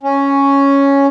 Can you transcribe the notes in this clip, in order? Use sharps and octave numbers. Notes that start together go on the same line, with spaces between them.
C#4